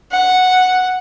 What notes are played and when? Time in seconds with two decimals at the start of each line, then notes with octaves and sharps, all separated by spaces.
0.12 F#5